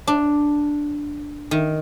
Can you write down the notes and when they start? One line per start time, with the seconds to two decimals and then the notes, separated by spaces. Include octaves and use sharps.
0.07 D4
1.51 D#3